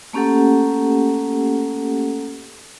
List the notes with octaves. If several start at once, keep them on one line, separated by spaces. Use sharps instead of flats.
A3 A#3 C#4 G4 A4 F#5